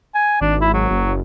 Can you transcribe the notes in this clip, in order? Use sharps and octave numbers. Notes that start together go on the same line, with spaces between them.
G#5
G#1 D4
E4
F#3
F#1